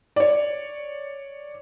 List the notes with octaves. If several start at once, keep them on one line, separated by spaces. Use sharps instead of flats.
C#5 D5